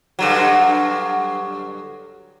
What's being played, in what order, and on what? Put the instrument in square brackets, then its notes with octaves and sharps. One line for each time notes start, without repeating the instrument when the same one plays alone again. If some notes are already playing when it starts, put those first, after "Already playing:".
[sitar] G2 D3 F#3